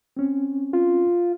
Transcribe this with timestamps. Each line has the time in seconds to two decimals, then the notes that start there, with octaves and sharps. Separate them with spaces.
0.17 C4 C#4
0.73 F4